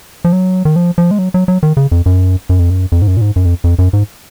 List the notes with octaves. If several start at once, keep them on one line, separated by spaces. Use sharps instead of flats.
F3
F#3
D#3
F3
F3
G#3
F#3
F#3
F#3
D#3
C#3
F2
F#2
F#2
F2
F#2
F2
G#2
F#2
A#2
G#2
F#2
F2
F2
F#2
G#2